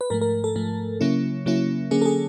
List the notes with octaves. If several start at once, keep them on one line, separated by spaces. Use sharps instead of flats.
B4
G#2 F3 A3 A#4
A#4
A4
G#2 F3 A3
C#3 F#3 A#3 C#4 E4
C#3 F#3 A#3 C#4 E4
D3 F#3 A#3 C#4 G#4
A4
G#4